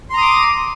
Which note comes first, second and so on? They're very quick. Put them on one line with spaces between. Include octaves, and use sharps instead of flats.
C6 A#5 D#6 D6